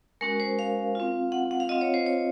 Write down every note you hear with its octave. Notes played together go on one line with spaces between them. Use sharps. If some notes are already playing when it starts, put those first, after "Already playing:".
G#3 C#4 F#4 A#4
C5
F5
C4 F4
F#5
F#5
F5
C4 F4 D#5
C#5
C5
C#5